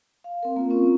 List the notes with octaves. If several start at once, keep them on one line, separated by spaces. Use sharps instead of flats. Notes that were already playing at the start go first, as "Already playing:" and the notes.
F5
C4 A#4
A#3 F4
C4 C#4 F4